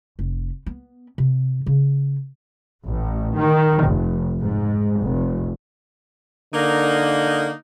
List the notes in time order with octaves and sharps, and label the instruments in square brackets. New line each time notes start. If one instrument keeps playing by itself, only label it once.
[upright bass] F1
B3
C3
C#3
[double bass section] A1
D#3
F1
G#2
F1
[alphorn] D3 [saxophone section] A#3 D#4